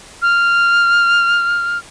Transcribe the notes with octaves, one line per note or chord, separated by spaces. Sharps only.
F6